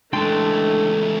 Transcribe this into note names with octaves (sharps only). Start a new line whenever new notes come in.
C#2 E3 A3 D4 A4 G5 C6